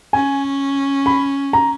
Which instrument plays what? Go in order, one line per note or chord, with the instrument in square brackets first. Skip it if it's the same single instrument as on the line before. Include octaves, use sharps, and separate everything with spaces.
[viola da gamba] C#4 [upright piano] G#5
[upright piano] B5
A#5